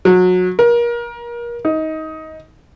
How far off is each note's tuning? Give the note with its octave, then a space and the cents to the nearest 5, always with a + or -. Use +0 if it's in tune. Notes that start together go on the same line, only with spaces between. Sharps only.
F#3 -25
A#4 +30
D#4 +20